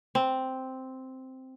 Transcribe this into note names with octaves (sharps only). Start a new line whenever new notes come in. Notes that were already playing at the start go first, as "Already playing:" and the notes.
C4